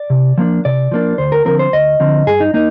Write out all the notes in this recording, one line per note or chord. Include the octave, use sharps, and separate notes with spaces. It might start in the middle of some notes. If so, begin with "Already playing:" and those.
Already playing: D5
C3
F3 A#3 D4
C3 D5
F3 A#3 D4
D2 C5
A#4
D3 F3 C4 A#4
C5
D2 D#5
D3 F3 C4
G2 G#4
D#4
A#3 D#4